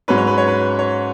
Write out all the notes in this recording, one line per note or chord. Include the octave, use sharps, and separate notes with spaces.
G#2 F#3 C#4 B4
C#5
B4
C#5
B4
C#5